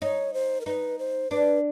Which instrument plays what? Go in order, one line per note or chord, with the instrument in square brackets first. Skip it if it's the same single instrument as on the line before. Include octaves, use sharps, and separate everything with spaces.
[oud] D#4 [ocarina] C#5
[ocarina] C5
A#4
[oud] D#4 [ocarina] B4
[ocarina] C5
[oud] D4 [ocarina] B4